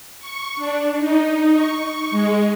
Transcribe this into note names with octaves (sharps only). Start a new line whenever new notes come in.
C#6
D4
D#4
C#6
G#3